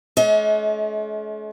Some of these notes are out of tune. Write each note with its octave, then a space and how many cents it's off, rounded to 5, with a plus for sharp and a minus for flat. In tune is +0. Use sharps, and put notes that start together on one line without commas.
A3 -45 C#4 +40 D#5 +40